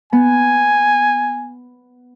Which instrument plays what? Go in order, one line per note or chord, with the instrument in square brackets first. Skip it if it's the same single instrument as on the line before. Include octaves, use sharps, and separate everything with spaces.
[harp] B3 [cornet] G#5